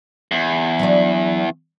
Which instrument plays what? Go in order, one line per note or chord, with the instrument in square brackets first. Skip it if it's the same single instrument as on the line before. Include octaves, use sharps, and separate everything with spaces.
[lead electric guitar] E2
[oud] F#3 D4 D5